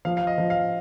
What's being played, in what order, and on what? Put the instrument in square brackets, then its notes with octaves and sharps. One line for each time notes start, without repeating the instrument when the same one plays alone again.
[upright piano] F3 [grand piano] F5
[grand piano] F5
D#5
[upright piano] F3
[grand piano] F5